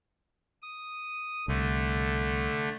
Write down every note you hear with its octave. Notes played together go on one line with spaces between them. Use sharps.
D#6
C2 D3 A3